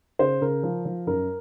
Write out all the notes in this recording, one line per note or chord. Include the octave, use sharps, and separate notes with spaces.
C#3 C5
C#3 A#4
F3
F3
F#2 A#4